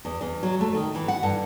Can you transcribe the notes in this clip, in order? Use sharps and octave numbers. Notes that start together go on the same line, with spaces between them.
E2
E2
F#3
A3
D#3
E3
F#5
G2